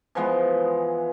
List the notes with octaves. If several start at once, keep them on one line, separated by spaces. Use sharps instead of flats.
E3 F3 G#3 B3